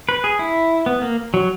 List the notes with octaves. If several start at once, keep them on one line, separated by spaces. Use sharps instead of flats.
B4
G#4
E4
B3
A#3
F#3